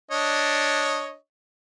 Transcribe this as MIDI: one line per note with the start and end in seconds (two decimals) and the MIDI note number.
0.11 1.15 62
0.11 1.15 73
0.11 1.15 75